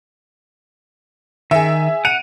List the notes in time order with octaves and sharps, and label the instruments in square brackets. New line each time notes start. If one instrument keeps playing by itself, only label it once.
[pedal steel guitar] D#3 [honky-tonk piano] G#4 E5
[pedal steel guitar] F#5 [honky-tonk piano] D7 D#7 F7